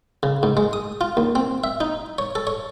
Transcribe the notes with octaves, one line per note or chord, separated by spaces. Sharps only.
C#3
G#2
G#3
D#6
F4
D#2
C4
E5
D#4
C#5
A4
C#5